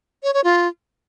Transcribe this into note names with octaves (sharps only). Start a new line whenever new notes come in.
C#5
C#5
F4